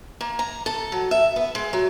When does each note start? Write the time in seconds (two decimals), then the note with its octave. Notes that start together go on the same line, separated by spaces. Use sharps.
0.21 A#3
0.39 A#5
0.66 A4
0.92 F#3
1.11 E5
1.36 B3
1.55 G#3
1.73 F#3